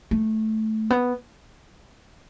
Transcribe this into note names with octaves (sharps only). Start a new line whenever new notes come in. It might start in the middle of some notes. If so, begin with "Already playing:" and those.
A3
B3